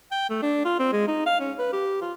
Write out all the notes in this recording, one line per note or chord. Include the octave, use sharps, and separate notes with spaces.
G5
A3
D4
F4
C4
G#3
D#4
F5
C#4
B4
G4
F4